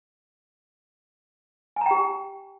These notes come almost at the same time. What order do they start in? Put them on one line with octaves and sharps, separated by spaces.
G#5 A#5 G5 G4